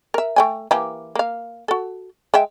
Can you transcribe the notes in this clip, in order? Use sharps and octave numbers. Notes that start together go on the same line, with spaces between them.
A#4 E5
A3 G5 G#5
E3 A#3 G4
A#3 F5
F#4 A4
G#3 E5 G5